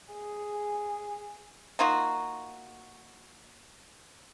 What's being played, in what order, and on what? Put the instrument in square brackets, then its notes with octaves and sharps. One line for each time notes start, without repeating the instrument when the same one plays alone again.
[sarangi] G#4
[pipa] A#3 D#4 F4 F#4